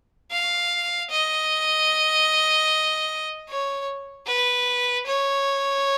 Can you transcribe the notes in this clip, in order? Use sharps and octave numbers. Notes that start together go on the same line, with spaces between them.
F5
D#5
C#5
B4
C#5